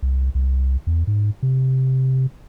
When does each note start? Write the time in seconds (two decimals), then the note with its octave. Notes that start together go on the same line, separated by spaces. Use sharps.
0.02 C2
0.35 C2
0.87 E2
1.07 G#2
1.43 C3